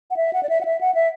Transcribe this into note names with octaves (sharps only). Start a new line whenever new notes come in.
F#5
E5
F#5
D5
E5
F#5
E5
F#5
E5